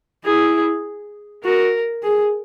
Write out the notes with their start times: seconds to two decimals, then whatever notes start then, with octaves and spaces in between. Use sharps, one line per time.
0.24 E4 G#4
1.43 F#4 A#4
2.03 G#4